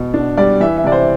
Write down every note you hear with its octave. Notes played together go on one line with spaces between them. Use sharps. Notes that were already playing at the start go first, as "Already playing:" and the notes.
Already playing: B2
D4
G3 D5
E3 E5
E5
C3 D5
C5